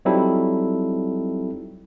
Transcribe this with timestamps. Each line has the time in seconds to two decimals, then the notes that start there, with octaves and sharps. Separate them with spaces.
0.05 F#3 G3 C4 D#4 E4 A4